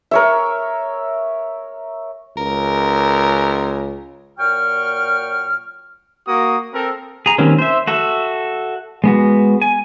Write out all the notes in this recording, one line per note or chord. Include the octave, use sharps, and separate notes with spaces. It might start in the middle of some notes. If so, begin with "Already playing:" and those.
A#4 C#5 E5
C#2 A#4
A#2 F#3 G5 C#6 F6
A#3 F#4 D#6
C4 A4 A#4
G#4 A#5
D#3 G3 A#3 C4 C#4
C5 E5
F#4 A4 E5
G#3 B3 F#4
G#5